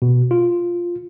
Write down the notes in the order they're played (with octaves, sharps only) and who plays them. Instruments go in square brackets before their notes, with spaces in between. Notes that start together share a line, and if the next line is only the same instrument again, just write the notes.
[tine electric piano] B2
F4